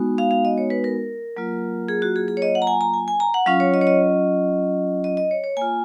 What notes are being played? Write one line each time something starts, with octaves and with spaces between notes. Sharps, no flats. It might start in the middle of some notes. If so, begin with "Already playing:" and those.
Already playing: G#3 B3 D#4 F#4
F5
F5
D#5
C#5
B4
A#4
F#3 A#3 F4
G#4
F#4
G#4
G#4
C#5
D#5
F#5
A#5
G#5
A#5
G#5
G#5
A#5
F#5
F#3 C#4 F4 F5
C#5
D#5
C#5
D#5
D#5
D#5
C#5
C#5
A#3 F4 G#5